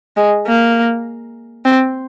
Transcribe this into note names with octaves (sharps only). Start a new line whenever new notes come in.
G#3
A#3
C4